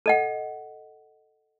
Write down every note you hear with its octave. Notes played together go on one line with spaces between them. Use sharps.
A4 D#5 F#5